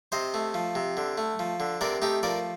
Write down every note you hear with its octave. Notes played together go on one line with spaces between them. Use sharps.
C3 C5 D#5
A3
F3
C3
D3
A3
F3
D3
C3 A#4 D5
A3 D#4 G4
F3 A#4 D5